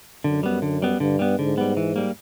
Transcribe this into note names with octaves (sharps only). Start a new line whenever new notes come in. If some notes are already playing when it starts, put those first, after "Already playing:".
F#2 D3
G3 B3
D3
G3 B3
G2 D3
G3 B3
G#2 D3
G3 B3
E3
G3 A#3